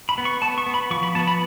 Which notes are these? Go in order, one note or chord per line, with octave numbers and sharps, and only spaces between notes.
B5
B3
C#6
B3 A5
C#6
B3
B5
F3 C#6
B5
B3 A5
B5